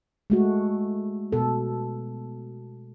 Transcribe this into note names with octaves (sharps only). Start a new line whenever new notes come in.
G#3 A3 F#4
B2 A4